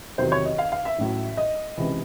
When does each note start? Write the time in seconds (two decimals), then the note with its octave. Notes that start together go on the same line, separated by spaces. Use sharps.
0.18 E2 C3 D#3 F#3 C5
0.32 C#5
0.45 D#5
0.58 F5
0.72 F5
0.85 E5
0.98 A1 A2 F#3
1.37 D#5
1.77 C#2 C3 E3